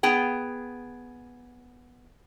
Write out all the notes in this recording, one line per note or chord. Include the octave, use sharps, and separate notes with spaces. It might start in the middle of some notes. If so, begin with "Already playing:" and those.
B3 G#4 G5